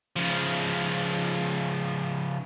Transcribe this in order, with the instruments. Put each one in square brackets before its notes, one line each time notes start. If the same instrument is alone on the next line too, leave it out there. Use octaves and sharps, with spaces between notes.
[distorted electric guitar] C#3 F3